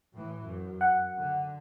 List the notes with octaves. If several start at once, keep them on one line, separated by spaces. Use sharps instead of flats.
A2 E3
F#2
F#5
D3